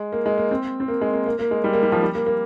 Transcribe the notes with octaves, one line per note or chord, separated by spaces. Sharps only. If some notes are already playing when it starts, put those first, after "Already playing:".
Already playing: G#3
A#3
G#3
A#3
C4
C4
A#3
G#3
A#3
A#3
A#3
G#3
G3
A#3
G3
F3
G3
A#3
A#3